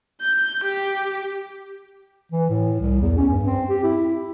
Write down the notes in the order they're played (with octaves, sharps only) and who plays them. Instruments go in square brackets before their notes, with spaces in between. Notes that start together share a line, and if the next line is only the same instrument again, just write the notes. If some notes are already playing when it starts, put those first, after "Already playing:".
[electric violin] G6
G4
[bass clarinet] E3
A2
C2
E2
C#4
G2
C4
G4
E4